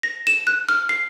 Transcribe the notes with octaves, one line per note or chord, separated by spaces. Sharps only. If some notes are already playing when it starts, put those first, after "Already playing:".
A#6
E7
F#6
F6
C7